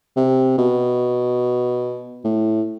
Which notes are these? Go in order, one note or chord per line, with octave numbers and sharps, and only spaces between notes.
C3
B2
A2